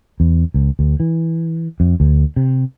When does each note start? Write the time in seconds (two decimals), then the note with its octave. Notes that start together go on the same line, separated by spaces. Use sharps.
0.20 E2
0.54 C#2
0.79 D2
1.00 E3
1.80 F2
2.00 D2
2.36 C3